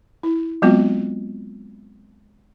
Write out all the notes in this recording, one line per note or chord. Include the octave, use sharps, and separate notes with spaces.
E4
F#3 G#3 B3 C4 F4 F#4